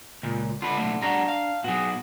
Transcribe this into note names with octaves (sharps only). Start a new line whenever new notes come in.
C#2 A#2
D3 F4 B4
B1 A2
G3 D4 F#4 A#5
F5
B2 F#3 F#4 G#4